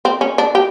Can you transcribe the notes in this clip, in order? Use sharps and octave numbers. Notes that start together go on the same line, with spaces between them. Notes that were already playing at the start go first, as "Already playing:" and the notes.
C4
C#4
D4
G4